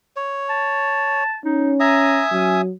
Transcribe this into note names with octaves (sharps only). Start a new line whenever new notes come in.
C#5
A5
C#4 D#4
E5 G#5 A#5 D#6
F#3 C#4